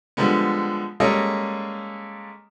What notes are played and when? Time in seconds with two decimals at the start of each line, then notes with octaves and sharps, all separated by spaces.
0.17 D3 F3 G3 G#3 B3
1.00 G3 G#3 A#3 C#4 A4 D#5